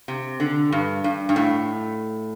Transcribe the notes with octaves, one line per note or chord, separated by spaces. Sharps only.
C3
D3
G2
G2
G2
A2